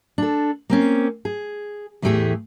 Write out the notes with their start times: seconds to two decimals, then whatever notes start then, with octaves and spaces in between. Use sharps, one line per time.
0.18 D4 A4
0.70 A#3 C4 C#4
1.25 G#4
2.02 E2 A2 E3 A3 G4 G#4